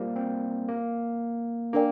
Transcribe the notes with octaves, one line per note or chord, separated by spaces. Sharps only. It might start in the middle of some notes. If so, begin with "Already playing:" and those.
Already playing: G3 A#3 F4 C5
C4
A#3
A#3 D4 A#4 D5 G5